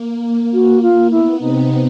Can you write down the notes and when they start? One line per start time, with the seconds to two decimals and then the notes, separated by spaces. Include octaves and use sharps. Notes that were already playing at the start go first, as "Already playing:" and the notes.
Already playing: A#3
0.53 F#4
0.82 F4
1.11 B3 E4
1.39 C3 C4 D#4